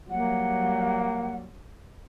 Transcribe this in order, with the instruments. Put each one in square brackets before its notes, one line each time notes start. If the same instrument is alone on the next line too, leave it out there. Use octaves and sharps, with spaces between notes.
[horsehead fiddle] F#3 G3 [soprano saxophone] A#3 [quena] F#5